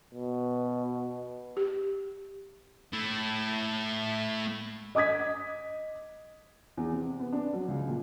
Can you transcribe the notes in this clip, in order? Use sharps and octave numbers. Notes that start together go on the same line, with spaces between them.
B2
G4
A3 E4
D#5 D6 D#6 G#6 B6
E2
C3
B3
D4
F#3
C#2
A#2